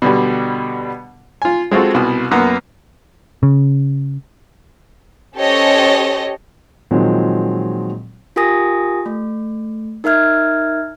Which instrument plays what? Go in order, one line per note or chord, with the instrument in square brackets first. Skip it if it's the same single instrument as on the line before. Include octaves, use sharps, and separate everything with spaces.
[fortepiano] B2 D3 G3
F4 G#5
G#3 C4 F4 F#4 A4
C2 B2
F#2 A#3 B3
[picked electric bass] C#3
[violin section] C#4 G4 A4 C5 C#5 D#5
[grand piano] A#2 D#3 F3 F#3 G#3 C4
[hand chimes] F4 G4 A#4 G#5 D#6 A#6
A3
D#4 A#4 E5 F6 G#6